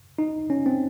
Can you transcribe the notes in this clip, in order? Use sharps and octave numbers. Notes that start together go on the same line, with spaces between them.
D#4
C#4
C4